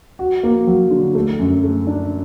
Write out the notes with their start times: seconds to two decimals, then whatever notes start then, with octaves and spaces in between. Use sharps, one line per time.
0.19 F#4
0.43 A#3
0.67 F#3
0.91 D3
1.15 A3
1.39 F#2
1.63 A3
1.87 D4